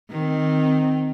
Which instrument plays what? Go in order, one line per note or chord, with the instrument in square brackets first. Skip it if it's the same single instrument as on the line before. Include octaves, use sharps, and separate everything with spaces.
[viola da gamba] D#3 C4